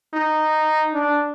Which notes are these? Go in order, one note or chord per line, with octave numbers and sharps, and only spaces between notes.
D#4
D4